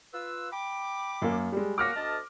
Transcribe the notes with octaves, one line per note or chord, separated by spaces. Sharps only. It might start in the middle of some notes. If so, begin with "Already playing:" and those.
F4 B4 E6
G5 B5 D6
F#2 A#3
G3 G#3
A#3 F#4 D6 F6 A#6
D2 D#5 A5